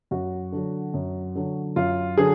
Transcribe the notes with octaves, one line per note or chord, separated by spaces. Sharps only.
F#2 F#4
D3 F#3
F#2
D3 F#3
F#2 F4
D3 F#3 G#4